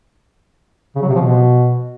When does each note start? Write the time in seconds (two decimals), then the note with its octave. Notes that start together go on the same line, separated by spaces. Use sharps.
0.96 C#3
1.02 F#3
1.09 C3
1.15 F3
1.21 B2